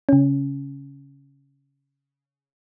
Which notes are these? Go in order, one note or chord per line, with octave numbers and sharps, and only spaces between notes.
C#3 C#4